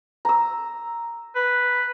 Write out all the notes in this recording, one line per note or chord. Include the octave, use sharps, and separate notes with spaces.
A#5 E6
B4